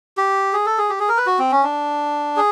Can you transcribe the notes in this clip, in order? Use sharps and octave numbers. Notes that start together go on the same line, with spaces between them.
G4
G#4
A4
G#4
G4
G#4
A#4
B4
F#4
C4
C#4
D4
G#4